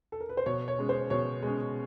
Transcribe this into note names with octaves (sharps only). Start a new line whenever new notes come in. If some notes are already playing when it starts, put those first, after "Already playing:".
A4
A#4
B4
C5
B2 C#5
C#5
G#3 C#4
C5
B2 C#5
G#3 C#4